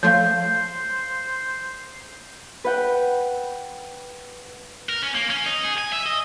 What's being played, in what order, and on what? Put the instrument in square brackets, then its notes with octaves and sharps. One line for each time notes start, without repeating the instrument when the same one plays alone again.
[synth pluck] F3 A3 C6 [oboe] C5 [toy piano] C#5 F5 [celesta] G6
[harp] B4 F#5 G5
[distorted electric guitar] A#4
C#4
A#3
C#4
D#4
G#4
G#5
E5
D#5